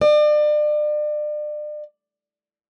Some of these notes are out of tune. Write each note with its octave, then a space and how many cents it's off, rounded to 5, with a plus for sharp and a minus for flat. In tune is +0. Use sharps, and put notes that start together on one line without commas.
D5 +35